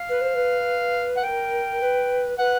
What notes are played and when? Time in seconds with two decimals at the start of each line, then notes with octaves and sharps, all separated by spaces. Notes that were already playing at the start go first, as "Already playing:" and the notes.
Already playing: F5
0.08 B4
0.20 C5
0.34 B4
1.16 F#5
1.23 A#4 G5
1.80 B4
2.38 B4 F#5